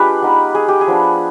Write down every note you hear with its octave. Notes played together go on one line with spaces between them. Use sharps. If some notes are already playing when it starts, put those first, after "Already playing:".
Already playing: G#3 D4 F4 G4 B4
B3 D#4
G#4
G4
G#4
F3 B3 D4